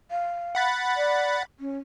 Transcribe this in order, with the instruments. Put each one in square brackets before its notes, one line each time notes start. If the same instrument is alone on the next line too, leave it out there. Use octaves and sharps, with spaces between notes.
[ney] F5
[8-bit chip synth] F#5 B5 A6
[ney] D5
C#4